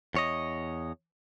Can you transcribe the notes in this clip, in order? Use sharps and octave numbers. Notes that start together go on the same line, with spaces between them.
E2 C#5 D#5